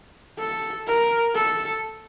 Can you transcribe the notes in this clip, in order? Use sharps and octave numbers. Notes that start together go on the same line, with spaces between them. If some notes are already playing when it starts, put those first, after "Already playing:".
A4
A#4
A4